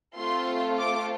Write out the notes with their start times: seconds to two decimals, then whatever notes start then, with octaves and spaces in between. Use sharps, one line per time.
0.15 A3 C4 F4 A4 C6
0.79 D6